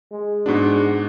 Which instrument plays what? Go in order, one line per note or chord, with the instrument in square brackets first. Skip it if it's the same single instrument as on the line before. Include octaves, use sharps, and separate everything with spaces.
[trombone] G#3
[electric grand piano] G#2 B3 D4 [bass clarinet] F#4